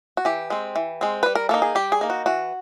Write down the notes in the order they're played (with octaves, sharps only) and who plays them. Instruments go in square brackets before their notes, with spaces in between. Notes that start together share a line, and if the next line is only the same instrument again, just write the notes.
[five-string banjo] F#4
E3 G4
G#3 C4
E3
G#3 C4
G3 B4
A#4
A#3 D#4 A4
G#4
G3 G4
G#4
A#3 D#4
F#4
E3 F#4